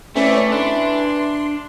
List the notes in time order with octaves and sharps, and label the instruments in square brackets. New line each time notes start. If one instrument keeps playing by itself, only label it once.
[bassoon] E3 [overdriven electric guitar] A3 [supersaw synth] C4 C#4 D5
[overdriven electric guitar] D4 [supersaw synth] C6